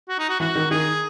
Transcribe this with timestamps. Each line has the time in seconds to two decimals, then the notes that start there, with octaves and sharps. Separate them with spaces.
0.09 F#4
0.19 D#4
0.29 F#4
0.40 E3 F#4
0.55 D#3
0.71 D#3 G#4